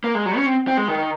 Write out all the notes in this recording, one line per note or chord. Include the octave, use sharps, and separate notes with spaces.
A#3
G#3
F#3
C#4
C4
C4
G#3
D#3